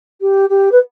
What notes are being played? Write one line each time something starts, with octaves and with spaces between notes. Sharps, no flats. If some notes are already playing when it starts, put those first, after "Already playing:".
G4
G4
B4